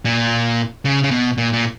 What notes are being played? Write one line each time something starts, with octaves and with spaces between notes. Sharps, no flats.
A#2
C#3
C#3
B2
A#2
A#2